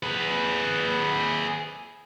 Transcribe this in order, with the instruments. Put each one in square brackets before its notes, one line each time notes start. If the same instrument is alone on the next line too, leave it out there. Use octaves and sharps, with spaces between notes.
[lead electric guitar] G#4 B4